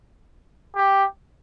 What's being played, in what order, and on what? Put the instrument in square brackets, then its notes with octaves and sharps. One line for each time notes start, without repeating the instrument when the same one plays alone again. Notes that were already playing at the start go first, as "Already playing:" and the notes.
[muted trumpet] G4